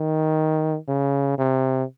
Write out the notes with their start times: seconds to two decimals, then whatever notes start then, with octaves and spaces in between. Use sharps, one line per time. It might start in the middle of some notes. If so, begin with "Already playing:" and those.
Already playing: D#3
0.88 C#3
1.38 C3